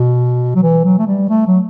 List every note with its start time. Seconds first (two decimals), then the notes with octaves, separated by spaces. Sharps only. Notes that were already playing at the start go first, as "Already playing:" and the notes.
Already playing: B2
0.55 F#3
0.63 E3
0.85 F#3
0.98 A3
1.07 G3
1.29 A3
1.47 F#3